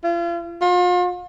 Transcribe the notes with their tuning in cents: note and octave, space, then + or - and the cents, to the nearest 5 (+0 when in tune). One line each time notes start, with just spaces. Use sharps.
F4 -40
F4 +40